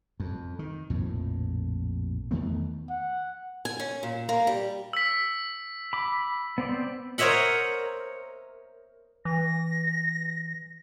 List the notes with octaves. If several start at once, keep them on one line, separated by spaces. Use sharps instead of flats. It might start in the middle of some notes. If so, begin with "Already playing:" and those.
F2
D#3
A#1 F2 A2
E2 D#3 A3 B3
F#5
G#5
C#4
A#2
A#3
G3
E6 B6
B5 D6
B3 C4 D5
A#4 C5 C#5 D#5 E5 F#5
E3 A#6